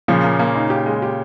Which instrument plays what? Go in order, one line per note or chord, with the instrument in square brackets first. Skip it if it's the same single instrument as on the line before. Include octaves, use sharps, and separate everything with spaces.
[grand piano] A#2 C#3 [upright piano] F3
[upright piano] A#3
A#3
D#4
G4
G#3
G4